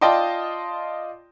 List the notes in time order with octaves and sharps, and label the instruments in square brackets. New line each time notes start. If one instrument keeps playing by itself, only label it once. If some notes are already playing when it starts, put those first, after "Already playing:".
[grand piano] F4 D5 D#5 G5 A5 C6